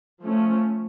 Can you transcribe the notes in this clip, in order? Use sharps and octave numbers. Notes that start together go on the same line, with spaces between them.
F3 A3 C#4